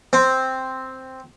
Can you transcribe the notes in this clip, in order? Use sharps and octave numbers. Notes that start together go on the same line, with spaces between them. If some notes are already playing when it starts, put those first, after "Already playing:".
C4